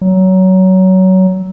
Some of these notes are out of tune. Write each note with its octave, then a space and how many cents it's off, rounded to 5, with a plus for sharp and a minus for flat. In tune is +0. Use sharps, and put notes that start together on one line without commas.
F#3 +20